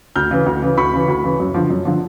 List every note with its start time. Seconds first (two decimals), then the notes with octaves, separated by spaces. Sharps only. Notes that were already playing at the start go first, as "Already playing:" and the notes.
0.16 D2 F6 G6
0.31 C#3 E3
0.46 D2
0.62 C#3 E3
0.77 D2 B5 C#6
0.93 C#3 E3
1.08 D2
1.24 C#3 E3
1.40 F#2
1.54 D3 F3
1.70 F#2
1.85 D3 F3